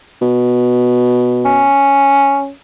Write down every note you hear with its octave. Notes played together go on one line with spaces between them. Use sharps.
B2
C#4